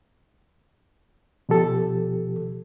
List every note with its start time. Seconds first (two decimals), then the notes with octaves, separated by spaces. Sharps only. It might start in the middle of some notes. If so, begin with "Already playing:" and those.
1.49 B2 F3 G4 A4